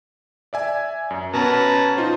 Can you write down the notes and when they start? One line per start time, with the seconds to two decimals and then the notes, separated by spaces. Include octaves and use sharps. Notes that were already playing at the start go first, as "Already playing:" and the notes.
0.53 D5 E5 G#5
1.10 F#2
1.33 B2 C#4 B4 A5 A#5
1.97 D#4 F4 C5